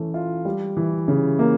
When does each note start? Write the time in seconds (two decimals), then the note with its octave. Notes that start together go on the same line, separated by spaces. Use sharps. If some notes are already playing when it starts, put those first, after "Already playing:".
Already playing: E3 A3 C#4
0.14 F4
0.45 G3
0.77 E3
1.08 C#3
1.39 A#3